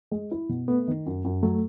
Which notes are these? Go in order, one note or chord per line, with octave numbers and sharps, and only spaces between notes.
G#3
E4
B2
A3 B3
D#3
F#2
F#2
F#3 A3